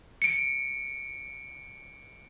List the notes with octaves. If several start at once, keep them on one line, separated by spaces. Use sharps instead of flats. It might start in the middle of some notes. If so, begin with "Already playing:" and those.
C#7 D7